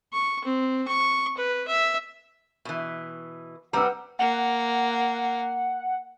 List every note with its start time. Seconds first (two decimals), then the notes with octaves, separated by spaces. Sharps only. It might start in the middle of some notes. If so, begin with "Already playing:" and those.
0.13 C#6
0.44 C4
0.88 C#6
1.37 B4
1.68 E5
2.65 B2 E3
3.73 G3 C4 B4 F#5 A#5 E6
4.19 A#3 F#5